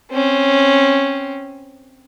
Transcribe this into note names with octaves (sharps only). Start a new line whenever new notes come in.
C4 C#4